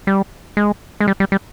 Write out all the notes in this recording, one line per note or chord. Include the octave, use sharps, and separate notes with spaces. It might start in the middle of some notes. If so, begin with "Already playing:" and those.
G3
G#3
G#3
G3
G3
G3